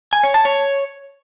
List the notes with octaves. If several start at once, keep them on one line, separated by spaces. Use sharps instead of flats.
G#5
C#5
A5
C#5